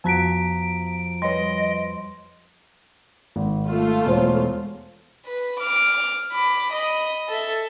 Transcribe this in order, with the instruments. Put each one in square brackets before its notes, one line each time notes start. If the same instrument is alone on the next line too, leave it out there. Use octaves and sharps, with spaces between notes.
[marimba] F2 F#4 F#5 [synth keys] F3 D7 [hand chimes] B3 A#5 B6
[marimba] G3 C#5 [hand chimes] B4 C6 [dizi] D#5
[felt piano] G#1
[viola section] A3 F4
[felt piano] E1 C5 C#5
[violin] B4
D6 F6
B5 D6
D#5 B5
A4 E5